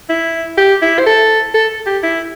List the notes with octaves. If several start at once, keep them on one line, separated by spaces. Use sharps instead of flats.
E4
G4
E4
C5
A4
A4
G4
E4